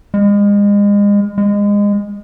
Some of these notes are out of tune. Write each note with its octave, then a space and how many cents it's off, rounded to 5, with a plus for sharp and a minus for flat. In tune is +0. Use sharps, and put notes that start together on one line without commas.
G#3 -35
G#3 -25